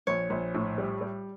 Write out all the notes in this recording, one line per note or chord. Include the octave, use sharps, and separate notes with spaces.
A#1 C#5
A#1
A2
G3
G3